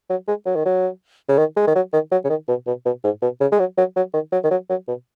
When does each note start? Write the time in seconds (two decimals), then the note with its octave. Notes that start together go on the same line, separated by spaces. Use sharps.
0.10 F#3
0.28 G#3
0.46 F#3
0.55 D#3
0.65 F#3
1.28 C#3
1.38 D#3
1.57 G#3
1.67 D#3
1.75 F#3
1.93 D#3
2.11 F#3
2.24 C#3
2.29 D#3
2.48 B2
2.67 B2
2.85 B2
3.04 G#2
3.22 B2
3.40 C#3
3.52 G#3
3.59 F#3
3.77 F#3
3.96 F#3
4.13 D#3
4.32 F#3
4.44 D#3
4.51 F#3
4.69 F#3
4.88 B2